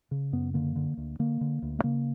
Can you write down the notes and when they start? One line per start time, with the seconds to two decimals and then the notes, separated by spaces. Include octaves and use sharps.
0.11 C#3
0.33 F#2 B3
0.54 D3 A#3
0.76 D3
0.97 D2
1.19 D3 A#3
1.41 D3
1.62 D2
1.79 A3
1.84 C#3 A#3